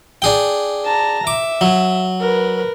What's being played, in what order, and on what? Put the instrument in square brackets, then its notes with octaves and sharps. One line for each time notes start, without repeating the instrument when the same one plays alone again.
[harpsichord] D4 G#4 G5
[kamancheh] A5 A#5
[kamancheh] E5 [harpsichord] D6
[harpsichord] F#3
[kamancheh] A#4 B4